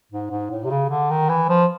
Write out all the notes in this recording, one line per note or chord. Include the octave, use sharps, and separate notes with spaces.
G#2
G#2
A2
C3
C#3
D3
D#3
E3
F3